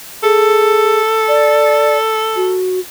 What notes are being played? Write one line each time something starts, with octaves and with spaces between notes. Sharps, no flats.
G#4 A4
D5
F#4